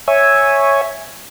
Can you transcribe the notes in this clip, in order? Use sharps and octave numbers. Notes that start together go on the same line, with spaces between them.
C#5 E5 G#5